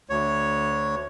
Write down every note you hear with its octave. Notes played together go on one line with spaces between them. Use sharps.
D2 C#5